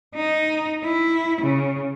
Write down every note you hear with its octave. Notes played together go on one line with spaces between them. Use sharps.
D#4
E4
C#3